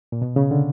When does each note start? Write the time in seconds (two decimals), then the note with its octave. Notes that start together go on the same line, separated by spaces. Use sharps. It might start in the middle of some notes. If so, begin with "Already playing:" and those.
0.12 A#2
0.22 B2
0.36 C#3
0.51 D3